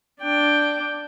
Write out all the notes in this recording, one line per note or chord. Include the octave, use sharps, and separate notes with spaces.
D4 G5